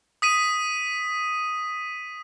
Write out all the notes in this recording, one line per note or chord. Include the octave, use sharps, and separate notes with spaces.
D#6 B6 D#7